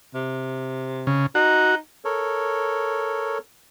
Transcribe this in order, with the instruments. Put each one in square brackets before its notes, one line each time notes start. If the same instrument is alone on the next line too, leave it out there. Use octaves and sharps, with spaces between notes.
[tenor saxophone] C3
[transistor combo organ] C#3
[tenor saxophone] D#4 [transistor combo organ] F#4
[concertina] A4 A#4 C#5